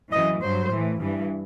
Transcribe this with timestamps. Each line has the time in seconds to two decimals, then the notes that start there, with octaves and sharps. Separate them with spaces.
0.12 F#2 E3 D#5
0.42 G2 F#3 C5
0.70 A2 E3
1.00 G2 E3